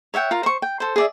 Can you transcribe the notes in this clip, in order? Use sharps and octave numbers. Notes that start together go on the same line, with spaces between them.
C#5 E5 F#5 G5
F4 A#4
C5 C#6
G5
A4 C5
G#4 D5 E5